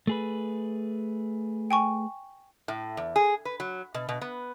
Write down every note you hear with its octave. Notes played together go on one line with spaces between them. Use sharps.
A3 G#4 B4
G5 G#5 C#6
A2
E2
G#4
B4
F#3
B2
B2
B3